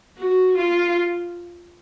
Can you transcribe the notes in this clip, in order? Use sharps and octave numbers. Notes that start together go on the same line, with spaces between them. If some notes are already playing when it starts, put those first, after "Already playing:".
F#4
F4